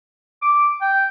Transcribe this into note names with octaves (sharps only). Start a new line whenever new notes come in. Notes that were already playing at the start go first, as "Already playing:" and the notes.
D6
G5